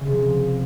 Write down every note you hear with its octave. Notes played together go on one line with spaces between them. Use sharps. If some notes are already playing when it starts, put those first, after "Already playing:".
C#3
C3
F3